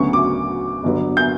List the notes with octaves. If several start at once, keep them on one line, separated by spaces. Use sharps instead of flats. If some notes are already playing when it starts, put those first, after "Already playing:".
Already playing: D2 C#3 F#3 B3 C#6
D6
G1 G2 D3 F#3 B3
G6